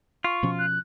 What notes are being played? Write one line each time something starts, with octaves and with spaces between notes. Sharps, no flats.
F4 C#6
B2 F3 C#4
F#6